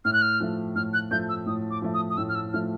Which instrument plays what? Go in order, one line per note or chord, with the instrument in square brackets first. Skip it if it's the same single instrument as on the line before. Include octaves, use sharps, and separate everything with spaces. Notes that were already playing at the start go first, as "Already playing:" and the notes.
[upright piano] A2 [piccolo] F6
[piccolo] F#6
F6
[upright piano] F3 A3
[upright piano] A2 [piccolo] F6
[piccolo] F#6
[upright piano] F3 A3 [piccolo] G6
[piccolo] E6
[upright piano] A2 [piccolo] D#6
[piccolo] D6
[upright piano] F3 A3
[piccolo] D#6
D#6
[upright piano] A2 [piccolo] E6
[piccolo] F6
E6
[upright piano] F3 A3 [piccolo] F6